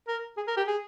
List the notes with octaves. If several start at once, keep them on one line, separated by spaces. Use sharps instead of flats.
A#4
G#4
A#4
G4
G#4